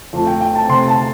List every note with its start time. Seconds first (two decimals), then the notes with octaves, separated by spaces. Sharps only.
0.13 F2 F3 A3
0.27 G5
0.41 G5
0.55 A5
0.69 C3 A3 C4 C6
0.88 A5